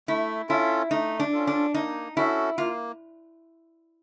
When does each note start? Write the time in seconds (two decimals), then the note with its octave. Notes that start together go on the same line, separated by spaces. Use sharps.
0.08 A3 E4
0.49 C#4 E4 F4 A4
0.91 A3 D#4
1.20 D4
1.33 C#4 F4 A4
1.47 D4
1.74 A#3 D#4
2.16 C#4 E4 F#4 A4
2.58 A#3 F4